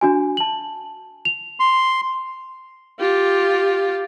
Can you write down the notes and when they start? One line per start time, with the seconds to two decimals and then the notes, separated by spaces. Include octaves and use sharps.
0.01 D4 F#4 G#5
0.37 A5 F#7
1.25 F7
1.60 C6
3.00 F4 G4